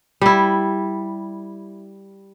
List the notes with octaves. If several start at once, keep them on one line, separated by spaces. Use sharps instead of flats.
G3 E4